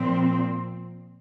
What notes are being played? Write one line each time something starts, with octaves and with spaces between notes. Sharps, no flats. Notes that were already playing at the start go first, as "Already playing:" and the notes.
Already playing: A#2 F3 C4